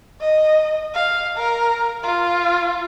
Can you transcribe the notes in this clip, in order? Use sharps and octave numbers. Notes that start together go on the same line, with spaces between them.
D#5
F5
A#4
F4